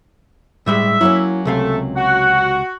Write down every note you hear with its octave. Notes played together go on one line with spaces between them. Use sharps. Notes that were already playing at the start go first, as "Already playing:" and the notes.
A2 G3 G#3 E5
F#3 A#3 C#4 E4
C#2 C3 A3 F5
F#4 F#5